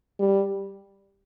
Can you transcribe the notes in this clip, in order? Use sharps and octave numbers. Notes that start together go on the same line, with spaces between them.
G3